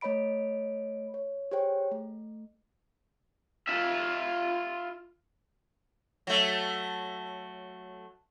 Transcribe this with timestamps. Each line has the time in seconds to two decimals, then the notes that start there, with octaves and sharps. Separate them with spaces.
0.01 A3 C#5 D#5 B5 D7
1.14 C#5
1.51 G4 G#4 C5 C#5 G5
1.91 A3
3.68 F4 E5
6.27 F#3 A3